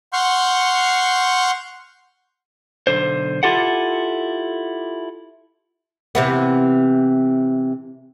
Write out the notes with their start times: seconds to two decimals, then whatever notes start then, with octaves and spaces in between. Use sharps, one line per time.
0.13 F#5 C6 C#6 F6 G6
2.87 B1 D3 C5
3.43 E4 F4 G4 A4 F#5
6.15 C3 E3 B3